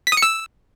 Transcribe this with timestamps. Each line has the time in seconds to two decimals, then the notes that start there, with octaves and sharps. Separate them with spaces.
0.07 B6
0.12 D#6
0.17 C#7
0.22 E6